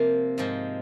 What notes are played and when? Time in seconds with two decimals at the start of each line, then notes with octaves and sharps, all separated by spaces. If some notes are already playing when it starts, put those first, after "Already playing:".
Already playing: C3 F3 A#3 C4
0.38 G#2 F3 G#3